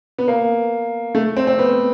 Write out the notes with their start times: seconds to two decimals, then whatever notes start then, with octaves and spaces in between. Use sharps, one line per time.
0.18 B3
0.28 A#3
1.15 A3
1.37 C4
1.47 C4
1.59 B3